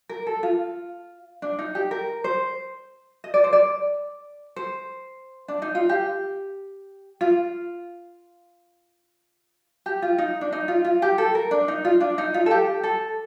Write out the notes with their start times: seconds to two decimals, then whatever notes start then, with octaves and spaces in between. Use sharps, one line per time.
0.09 A#4
0.27 A4
0.43 F4
1.42 D4
1.59 D#4
1.75 G4
1.91 A#4
2.24 C5
3.24 D#5
3.34 D5
3.44 C5
3.53 D5
4.56 C5
5.48 D4
5.62 D#4
5.75 F4
5.89 G4
7.21 F4
9.86 G4
10.02 F4
10.18 D#4
10.41 D4
10.53 D#4
10.68 F4
10.85 F4
11.02 G4
11.18 A4
11.35 A#4
11.51 D4
11.68 D#4
11.85 F4
12.00 D4
12.18 D#4
12.34 F4
12.46 A4
12.51 G4
12.83 A4